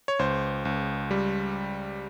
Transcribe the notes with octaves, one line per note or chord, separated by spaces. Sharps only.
C#5
C#2 C5
C#2
G3